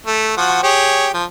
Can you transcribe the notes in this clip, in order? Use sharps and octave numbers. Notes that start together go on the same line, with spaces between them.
A3
F3 F#4 F#5
G4 G#4 C#5
F3